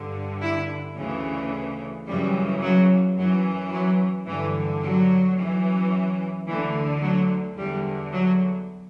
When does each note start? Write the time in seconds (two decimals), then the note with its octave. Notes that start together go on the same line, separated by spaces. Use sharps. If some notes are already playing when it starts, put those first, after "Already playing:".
Already playing: G2 D3
0.42 E4
0.97 D2 C#3 E3
2.07 F#2 C#3 E3 G3
2.62 F#3
3.17 F#2 E3 F#3
3.73 F#3
4.27 G2 D3 E3
4.82 F#3
5.37 F#2 E3
6.47 D2 D3 E3
7.02 F#3
7.57 E2 D3 G3
8.13 F#3